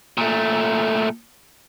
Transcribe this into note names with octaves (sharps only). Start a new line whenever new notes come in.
A#2 A3